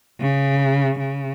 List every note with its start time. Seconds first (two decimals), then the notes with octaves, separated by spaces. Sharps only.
0.20 C#3
0.99 C#3